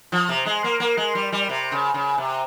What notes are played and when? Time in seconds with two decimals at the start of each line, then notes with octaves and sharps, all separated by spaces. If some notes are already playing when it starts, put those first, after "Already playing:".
0.12 F3
0.29 C3
0.46 G#3
0.64 A#3
0.80 A#3
0.97 G#3
1.15 G3
1.32 G3
1.49 C3
1.72 C#3
1.94 C#3
2.18 C3